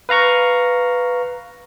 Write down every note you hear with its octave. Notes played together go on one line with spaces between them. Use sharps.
B4 F5 A#5 C#6